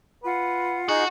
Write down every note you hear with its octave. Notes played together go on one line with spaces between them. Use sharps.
F4 B4 F#5
D#4 F#4 G#4